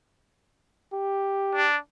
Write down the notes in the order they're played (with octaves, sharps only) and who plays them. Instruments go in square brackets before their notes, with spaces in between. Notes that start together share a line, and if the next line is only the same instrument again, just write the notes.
[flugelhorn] G4
[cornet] D4